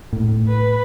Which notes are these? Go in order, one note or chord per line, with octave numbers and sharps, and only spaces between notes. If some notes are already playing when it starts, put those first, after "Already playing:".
A2
B4